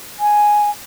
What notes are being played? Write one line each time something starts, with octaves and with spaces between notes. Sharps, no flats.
G#5